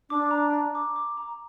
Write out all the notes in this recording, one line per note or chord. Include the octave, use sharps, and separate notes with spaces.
D4 D6
A#5
A#5
D6
D6
A#5